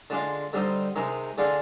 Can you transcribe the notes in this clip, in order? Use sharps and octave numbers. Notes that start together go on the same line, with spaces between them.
D3 G#3 D4 F4
D3 G3 C4 D#4
C3 D#3 G#3 D#4
D3 G#3 D4 F4